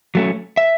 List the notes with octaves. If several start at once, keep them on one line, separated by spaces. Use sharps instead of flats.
F#3 A3 C#4
E5